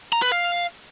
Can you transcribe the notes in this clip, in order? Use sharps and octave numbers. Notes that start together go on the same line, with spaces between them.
A#5
B4
F5